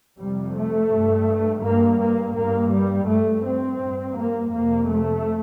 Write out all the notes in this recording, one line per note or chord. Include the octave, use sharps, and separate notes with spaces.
F2 C3 G3
A3
G2
G2 A#3
A#3
G2 A#3
G3
G2 A3
C4
G2
A#3
F2 C3 A#3
A3